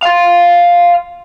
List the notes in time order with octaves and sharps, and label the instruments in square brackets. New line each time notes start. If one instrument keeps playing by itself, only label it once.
[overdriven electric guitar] F5 C6